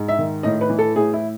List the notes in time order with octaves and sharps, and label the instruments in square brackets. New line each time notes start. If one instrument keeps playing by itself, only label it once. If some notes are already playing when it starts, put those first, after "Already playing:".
Already playing: [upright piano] G#2
E5
D#3
A2 D#5
B4
E3
A4
A2 G#4
E4